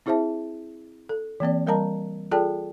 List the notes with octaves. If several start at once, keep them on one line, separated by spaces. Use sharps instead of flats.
C4 E4 G#4 C5 E5 A5
A4
E3 A#3 C4 D5
G3 A#4 D#5 A5 A#5
F4 G#4 A4 D5 G5 A5